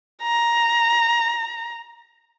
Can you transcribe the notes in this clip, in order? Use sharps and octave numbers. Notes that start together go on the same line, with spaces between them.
A#5